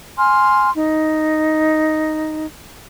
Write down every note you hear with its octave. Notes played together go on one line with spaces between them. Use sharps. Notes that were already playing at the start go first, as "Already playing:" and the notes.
G#5 C6 F6
D#4